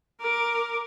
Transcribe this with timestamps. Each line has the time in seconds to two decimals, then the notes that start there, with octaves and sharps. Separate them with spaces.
0.21 A#4 D6